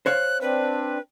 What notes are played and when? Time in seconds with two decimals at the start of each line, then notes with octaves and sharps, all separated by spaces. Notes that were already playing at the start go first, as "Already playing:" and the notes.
0.06 C5 C#5 F5 F#6
0.41 C4 D4 B4